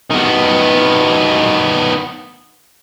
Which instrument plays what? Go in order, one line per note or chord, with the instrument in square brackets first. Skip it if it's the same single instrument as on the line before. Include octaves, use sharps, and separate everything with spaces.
[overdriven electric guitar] D#3 B3